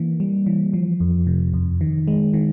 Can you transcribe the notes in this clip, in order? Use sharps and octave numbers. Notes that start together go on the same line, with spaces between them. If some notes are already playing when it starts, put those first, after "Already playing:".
Already playing: E3 A#3
G3
E3
F3
F2
C3
F2
D#3
G#3
D#3